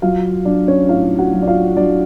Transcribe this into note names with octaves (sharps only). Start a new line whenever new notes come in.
F#3 F4 F5
F#3 D4 D5
C#4 C#5
A2 F4 F5
F#4 F#5
F#3
D5
F4 F5
F#3 D4 D5